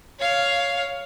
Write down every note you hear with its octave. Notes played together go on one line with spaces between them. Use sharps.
C#5 F5